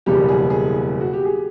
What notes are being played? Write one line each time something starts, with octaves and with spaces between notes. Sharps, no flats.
F#1 E2 B2 G3 G4
G#4
G#4
F#4
G4
G#4